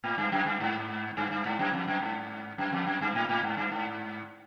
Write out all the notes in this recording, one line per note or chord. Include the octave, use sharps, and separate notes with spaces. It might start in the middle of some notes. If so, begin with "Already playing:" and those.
A2
G2
F#2
G2
G#2
G2
G2
G#2
F#2
F2
F#2
G#2
F#2
F2
F#2
G2
A2
A2
G#2
G2
G#2